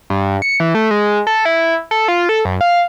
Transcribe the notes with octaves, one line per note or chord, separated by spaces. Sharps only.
G2
C#7
E3
A3
G#3
A4
E4
A4
F4
A4
F#2
F5